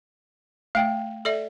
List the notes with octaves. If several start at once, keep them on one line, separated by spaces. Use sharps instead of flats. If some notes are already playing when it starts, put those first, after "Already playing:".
A3 F5 G5
A4 D5 E5